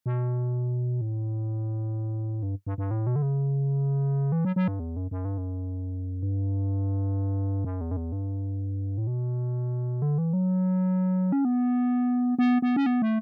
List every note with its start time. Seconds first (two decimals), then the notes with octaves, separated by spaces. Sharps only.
0.06 B2
1.01 A2
2.43 G2
2.67 G2
2.78 G2
2.91 A2
3.07 B2
3.16 D3
3.22 C#3
4.32 E3
4.45 F#3
4.56 F#3
4.68 G2
4.80 E2
4.96 F#2
5.11 F#2
5.25 G2
5.38 F#2
6.23 G2
7.64 F#2
7.81 E2
7.91 F#2
7.97 E2
8.12 G2
8.98 A2
9.07 B2
10.02 D3
10.18 E3
10.33 F#3
11.32 C#4
11.45 B3
12.39 B3
12.62 B3
12.76 C#4
12.86 B3
13.02 A3